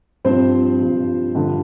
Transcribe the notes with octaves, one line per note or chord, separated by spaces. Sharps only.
G2 F3 C4 C5
G2 F3
G2 D3 F3